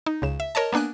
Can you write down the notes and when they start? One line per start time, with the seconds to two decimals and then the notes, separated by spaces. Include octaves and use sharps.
0.06 D#4
0.22 C#2 C#3 E7
0.40 E5
0.55 A#4 C#5 D#5 A5
0.73 A#3 B3 D4 G#5 F#6